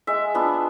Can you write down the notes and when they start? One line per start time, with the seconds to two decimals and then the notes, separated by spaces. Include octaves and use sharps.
0.07 G#3 E5
0.34 B3 D4 F4